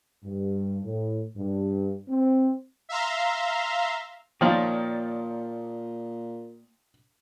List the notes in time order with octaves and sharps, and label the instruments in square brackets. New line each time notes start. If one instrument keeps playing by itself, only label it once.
[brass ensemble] G2
A2
G2
C4
[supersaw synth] E5 F5 A#5 C6
[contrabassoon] A#2 [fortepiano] D#3 F3 [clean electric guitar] A#3 C#5 D5